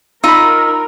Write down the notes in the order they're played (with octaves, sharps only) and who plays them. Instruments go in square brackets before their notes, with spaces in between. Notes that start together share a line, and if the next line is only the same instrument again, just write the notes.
[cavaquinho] D#4 [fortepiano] F4 B5 [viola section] A#4 [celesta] E6